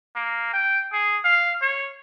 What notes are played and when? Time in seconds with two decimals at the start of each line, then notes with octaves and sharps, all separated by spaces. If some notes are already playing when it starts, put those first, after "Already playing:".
0.15 A#3
0.53 G5
0.93 G#4
1.24 F5
1.62 C#5